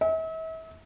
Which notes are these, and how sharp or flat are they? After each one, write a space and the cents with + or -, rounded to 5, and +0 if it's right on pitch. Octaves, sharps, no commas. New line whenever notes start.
E5 -40